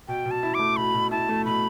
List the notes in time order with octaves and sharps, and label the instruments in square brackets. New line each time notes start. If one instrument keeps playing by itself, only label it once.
[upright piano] B2 [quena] G5
[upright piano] B2
[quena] A5
[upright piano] E4
[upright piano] A3 [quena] D6
[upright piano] B2 [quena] B5
[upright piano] B2
[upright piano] E4 [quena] A5
[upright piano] A3
[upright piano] B2 [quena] B5